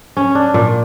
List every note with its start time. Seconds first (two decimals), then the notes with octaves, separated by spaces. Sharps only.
0.17 C#4
0.35 D4
0.54 A#2